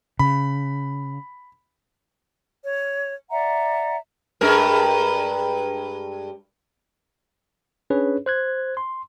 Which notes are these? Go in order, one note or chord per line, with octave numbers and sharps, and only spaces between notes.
C#3 B5
C#5
D5 E5 F#5 A#5
G2 G#3 A#4
C#4 D4 G#4 B4 C#5
C5 F#6 G#6
C6